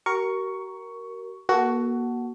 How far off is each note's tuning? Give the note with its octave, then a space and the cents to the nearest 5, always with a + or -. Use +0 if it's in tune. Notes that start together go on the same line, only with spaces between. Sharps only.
F#4 +45 A#4 +0 C#6 +10
A#3 +40 F#4 +10 A4 +0